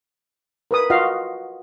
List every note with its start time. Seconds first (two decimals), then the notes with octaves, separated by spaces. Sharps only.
0.71 A#4 B4 D#6
0.90 F4 F#4 D#5 F5